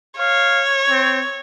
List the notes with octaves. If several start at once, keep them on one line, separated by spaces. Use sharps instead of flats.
C#5 F5
C4